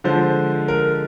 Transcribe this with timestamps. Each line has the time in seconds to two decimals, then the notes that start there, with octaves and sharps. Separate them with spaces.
0.04 D3 F3 G#3 C5
0.68 A#4